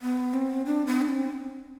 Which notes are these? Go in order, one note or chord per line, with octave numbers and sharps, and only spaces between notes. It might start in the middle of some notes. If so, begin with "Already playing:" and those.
B3
C4
D4
B3
D4
C4